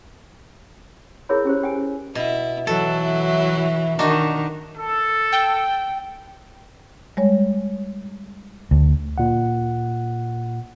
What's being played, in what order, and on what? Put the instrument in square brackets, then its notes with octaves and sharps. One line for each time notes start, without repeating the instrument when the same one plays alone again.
[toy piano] E4 G#4 A#4 C#5 B5
C#4 G4 C5
G5 G#5
[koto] B2 [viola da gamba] E4
[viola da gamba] E3 F#3 E4 [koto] A4
[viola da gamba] D#3 [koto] D4 D#4 F#4
[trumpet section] A4
[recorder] G5
[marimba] G3 G#3 C#5
[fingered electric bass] D2
[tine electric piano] A#2 F#5